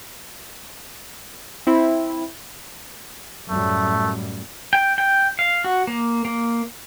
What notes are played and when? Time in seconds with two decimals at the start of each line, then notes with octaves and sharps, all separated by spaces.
1.67 C4 E4
3.49 F#2 A2 G3 A3
4.73 G5
4.98 G5
5.39 F5
5.64 F#4
5.87 A#3
6.25 A#3